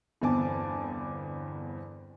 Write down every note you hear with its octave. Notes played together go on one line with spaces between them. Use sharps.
G1 E2 C4 G#5 A5 D6